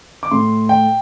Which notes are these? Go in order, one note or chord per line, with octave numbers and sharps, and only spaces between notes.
D6
A2 A3 C6
G5